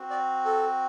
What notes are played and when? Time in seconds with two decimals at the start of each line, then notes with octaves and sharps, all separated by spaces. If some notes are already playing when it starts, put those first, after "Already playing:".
Already playing: C4 F#4
0.10 D5
0.45 A4